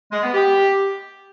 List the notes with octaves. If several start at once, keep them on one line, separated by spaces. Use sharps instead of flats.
G#3
B3
G4